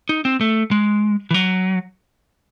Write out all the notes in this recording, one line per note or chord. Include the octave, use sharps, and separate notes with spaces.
D#4
C4
A3
G#3
E3
F#3